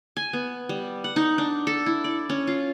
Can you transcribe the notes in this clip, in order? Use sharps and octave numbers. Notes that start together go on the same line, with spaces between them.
G#5
B3
G3
F#5
D#4
D4
A4
E4
D5
C#4
F4